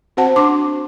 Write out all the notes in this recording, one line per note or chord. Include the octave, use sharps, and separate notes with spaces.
C4 F#4 C5 F#5 A5
D4 C6 D6